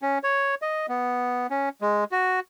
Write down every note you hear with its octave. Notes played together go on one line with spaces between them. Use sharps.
C#4
C#5
D#5
B3
C#4
G#3
F#4